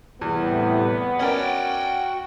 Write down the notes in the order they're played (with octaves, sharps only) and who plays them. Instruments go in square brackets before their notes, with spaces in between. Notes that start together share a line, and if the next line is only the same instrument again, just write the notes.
[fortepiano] E2 [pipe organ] A2 C3 G3 [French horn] B3
[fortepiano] C#4 A#4 D5 [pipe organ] F#4 [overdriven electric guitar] F#5 G5